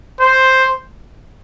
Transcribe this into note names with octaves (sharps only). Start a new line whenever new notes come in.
C5